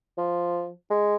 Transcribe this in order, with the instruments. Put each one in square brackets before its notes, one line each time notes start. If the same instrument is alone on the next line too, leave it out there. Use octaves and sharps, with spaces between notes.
[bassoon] F3
G#3